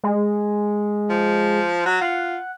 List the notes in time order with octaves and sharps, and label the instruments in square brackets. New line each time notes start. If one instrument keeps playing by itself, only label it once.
[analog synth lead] G#3
[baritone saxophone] F3
F#3
[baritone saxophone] F4 [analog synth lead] F#5